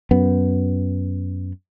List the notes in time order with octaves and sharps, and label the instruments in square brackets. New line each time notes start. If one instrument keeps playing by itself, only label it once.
[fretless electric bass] F#2 B3